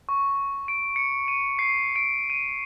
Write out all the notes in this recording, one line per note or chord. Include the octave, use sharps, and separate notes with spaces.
C#6
D7
C#7
D#7
C7
D7
D#7